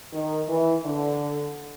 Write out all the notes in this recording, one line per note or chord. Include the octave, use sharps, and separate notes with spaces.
D#3
E3
D3